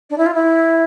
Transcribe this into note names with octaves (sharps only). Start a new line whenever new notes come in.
D4
E4
F4
E4